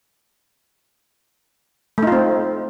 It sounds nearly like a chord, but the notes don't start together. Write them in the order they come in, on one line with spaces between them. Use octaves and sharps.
A3 D#4 F4 C4